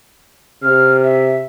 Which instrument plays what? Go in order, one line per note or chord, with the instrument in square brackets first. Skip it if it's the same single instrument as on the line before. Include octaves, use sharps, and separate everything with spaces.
[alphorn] C3 [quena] F6
[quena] E5